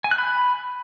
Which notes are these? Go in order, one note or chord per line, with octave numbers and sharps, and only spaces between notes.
G#5
F#6
B5